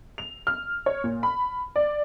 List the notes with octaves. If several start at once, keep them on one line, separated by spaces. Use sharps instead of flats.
F7
F6
C#5
A#2
B5
D5